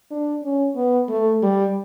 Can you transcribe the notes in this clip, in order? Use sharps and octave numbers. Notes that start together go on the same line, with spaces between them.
D4
C#4
B3
A3
G3